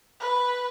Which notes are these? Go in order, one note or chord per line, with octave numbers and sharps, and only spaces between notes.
B4